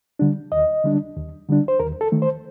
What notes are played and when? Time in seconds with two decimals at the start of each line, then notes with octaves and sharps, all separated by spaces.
0.19 D3 G3 D4
0.52 D#2 D#5
0.84 D3 G3 D4
1.17 D#2
1.48 D3 G3 D4
1.68 C5
1.80 D#2 A#4
2.01 A4
2.12 D#3 A3
2.22 C5